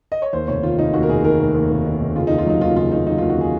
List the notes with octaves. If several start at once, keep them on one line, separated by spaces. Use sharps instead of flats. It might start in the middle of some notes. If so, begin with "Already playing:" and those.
D#5
C#5
D#2 C5
F1 C#5
D#3 F4
F1 D#4
D#2 F#4
A#4
F1 G#4
D#3 A#4
F1
D#2
F1
D#3
F1
C#3 F4
D#4
D#2
F4
F#3 D#4
D#2 F4
C#3 F4
D#2 D#4
F#3 D#4
F4
D#2
F#4
C#3 G#4